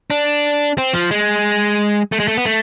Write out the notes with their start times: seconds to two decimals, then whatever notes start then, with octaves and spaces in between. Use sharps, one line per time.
0.10 D4
0.78 C4
0.93 F3
1.11 G#3
2.12 A3
2.20 G#3
2.28 A3
2.37 B3
2.45 A3